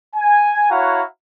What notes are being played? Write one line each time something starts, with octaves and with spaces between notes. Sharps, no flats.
G#5
E4 F#4 C#5 F5 F#5 A#5